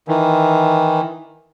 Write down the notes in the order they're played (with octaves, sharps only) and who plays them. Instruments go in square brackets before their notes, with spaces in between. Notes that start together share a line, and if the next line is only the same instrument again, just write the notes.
[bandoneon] D#3 E3